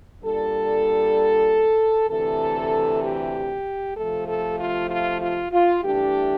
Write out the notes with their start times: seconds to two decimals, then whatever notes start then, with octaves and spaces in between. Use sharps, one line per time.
0.23 A#2 G3 D4 A4
2.09 D2 C3 E3 A4
3.03 G4
3.96 C3 F3 A3 A4
4.27 A4
4.59 F4
4.90 F4
5.21 F4
5.51 F4
5.83 G2 E3 A3 D4 G4